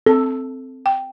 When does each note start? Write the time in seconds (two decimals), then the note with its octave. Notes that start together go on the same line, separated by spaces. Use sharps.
0.06 C4 A4
0.86 G5